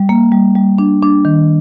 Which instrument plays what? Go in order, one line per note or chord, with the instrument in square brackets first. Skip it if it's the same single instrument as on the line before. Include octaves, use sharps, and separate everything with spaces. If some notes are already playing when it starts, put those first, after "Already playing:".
Already playing: [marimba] G3
A#3
G3
G3
D4
D4
D#3